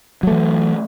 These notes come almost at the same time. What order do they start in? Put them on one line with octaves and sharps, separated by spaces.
F#3 A3 E3